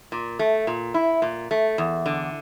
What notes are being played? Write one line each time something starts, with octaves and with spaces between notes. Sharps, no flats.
A#2
A3
A#2
E4
A#2
A3
E2
D3